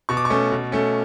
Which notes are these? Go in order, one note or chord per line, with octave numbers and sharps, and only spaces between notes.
B2 C#6
D6
C#6
A3 C#4
B2
A3 C#4